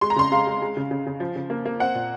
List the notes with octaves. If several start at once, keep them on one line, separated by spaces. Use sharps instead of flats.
G#3 C6
A#5
C#3 C6
G#3 F5
G#3
G#3
C#3
C#3
C#3
F3
C#3
A#3
A#3
C4 F#5
A#2